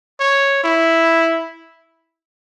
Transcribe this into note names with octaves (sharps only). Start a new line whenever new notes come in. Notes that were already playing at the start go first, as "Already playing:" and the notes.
C#5
E4